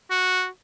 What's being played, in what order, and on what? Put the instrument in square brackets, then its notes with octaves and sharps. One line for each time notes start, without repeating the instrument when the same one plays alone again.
[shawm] F#4